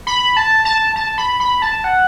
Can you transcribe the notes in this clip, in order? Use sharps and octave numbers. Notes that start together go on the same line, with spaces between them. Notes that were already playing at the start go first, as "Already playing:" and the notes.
B5
A5
A5
A5
B5
B5
A5
F#5